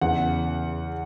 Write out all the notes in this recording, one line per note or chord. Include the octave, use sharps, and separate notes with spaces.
E2 C#3 E3 F#5